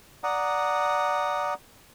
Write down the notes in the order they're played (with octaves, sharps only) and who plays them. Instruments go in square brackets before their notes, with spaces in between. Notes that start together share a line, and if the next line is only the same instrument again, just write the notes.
[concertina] D5 F#5 A#5 D#6